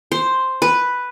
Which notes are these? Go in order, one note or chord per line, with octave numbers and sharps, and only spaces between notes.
C5
B4